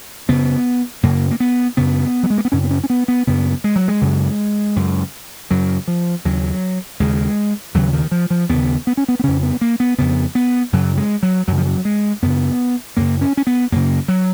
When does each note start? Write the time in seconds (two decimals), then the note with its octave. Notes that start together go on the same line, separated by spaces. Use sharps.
0.28 F#2 C#3 B3
1.03 F#2 C#3 A#3
1.31 A#3
1.40 B3
1.77 F#2 C#3 B3
2.23 F#3
2.30 G#3
2.38 A#3
2.45 B3
2.52 F#2 C#3 C#4
2.64 B3
2.71 C#4
2.84 C#4
2.90 B3
3.08 B3
3.27 F#2 C#3 B3
3.64 G#3
3.76 F#3
3.88 G#3
4.01 F#2 C#3
4.76 F#2 C#3
5.50 F#2 C#3 F#3
5.88 F3
6.25 D#2 C#3 F#3
7.00 D#2 C#3 G#3
7.74 D#2 C#3 F#3
7.93 D#3
8.11 F3
8.30 F3
8.49 D#2 C#3 B3
8.87 B3
8.97 C#4
9.08 B3
9.19 B3
9.23 F2 C#3 C#4
9.43 B3
9.61 A#3
9.80 B3
9.98 F2 C#3 B3
10.35 B3
10.73 F#2 C#3 F#3
10.97 G#3
11.23 F#3
11.48 F#2 C#3 F#3
11.57 F3
11.67 F#3
11.85 G#3
12.22 F#2 C#3 B3
12.97 F#2 C#3 A#3
13.21 C#4
13.37 C#4
13.47 B3
13.72 F#2 C#3 A#3
14.08 F#3